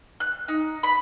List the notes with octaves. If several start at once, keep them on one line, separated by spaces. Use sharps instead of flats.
F#6
D#4
B5